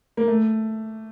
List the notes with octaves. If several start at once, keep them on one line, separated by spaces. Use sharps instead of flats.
A#3
A3